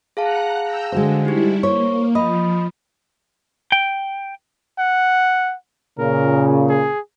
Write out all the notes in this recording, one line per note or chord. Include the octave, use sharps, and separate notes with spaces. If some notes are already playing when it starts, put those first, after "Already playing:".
G#4 F5 F#5 A5 A#5 F#6
G5 A#5 E6
D3 G#3 F#4 C5
G3 D#4 E4 G4
A#3 C5 C#5 C#6
F3 D#5 B5 D#6
G5
F#5
A#2 C#3 A#4
G#4